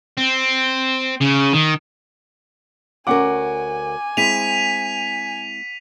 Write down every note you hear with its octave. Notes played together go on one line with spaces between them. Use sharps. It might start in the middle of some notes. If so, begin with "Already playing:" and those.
C4
C#3
D#3
D2 C#4 A#4 F#5 G#5 D6
G#3 C4 E4 B6 D#7 F7